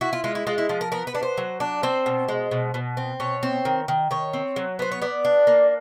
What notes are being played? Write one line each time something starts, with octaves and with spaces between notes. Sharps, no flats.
E4 F#4
F4
G#3 F4
E4
G#3 F4
E4
F3 F4
A#4
B3 A#4
B4
D4
C5
F#3
D4
C4 C5
B2
G#3
B2
B2
C4
B2 C#5
C4
D#3
D#3
D#3 C#5
C4
F#3
B3 C5
C#5
B3 D5
D4
A#3